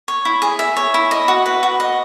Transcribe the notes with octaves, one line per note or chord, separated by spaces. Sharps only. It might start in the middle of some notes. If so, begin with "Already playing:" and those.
C#5
E4
G#4
E5
C#5
E4
D#5
F#4
B4
F#4
D#5